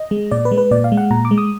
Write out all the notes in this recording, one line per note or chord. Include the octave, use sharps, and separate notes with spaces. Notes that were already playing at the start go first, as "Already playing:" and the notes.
Already playing: D#5
G#3
A#2 D5
B4
G#3
B4
A#2 D5
F5
G#3
F#5
A#2 A#5
D6
G#3
D#6